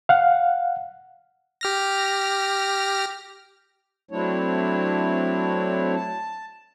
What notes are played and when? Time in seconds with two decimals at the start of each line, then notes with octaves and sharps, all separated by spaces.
0.09 F5 F#5
1.61 G4 F6 A#6
4.11 F#3 A3 C4 D4 E4 C#5
5.96 A5